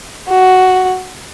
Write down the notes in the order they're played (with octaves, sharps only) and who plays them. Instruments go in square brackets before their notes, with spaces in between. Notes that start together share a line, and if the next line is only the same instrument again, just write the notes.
[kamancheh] F#4